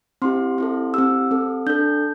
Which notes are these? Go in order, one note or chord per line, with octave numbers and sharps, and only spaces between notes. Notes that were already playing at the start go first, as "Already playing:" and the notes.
C4 E4 G4 C6
C4 E4 A4
C4 G4 E6
C4 A4
D4 A4 G6